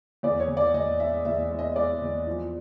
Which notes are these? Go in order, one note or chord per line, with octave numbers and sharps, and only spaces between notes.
E2 D5
C#5
E2
D5
E2 D#5
G#3 E5
E2 E5
G#3
D#5
G#3 D5
E2
F3